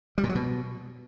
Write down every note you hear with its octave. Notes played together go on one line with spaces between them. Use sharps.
G3
A#2
F#3
B2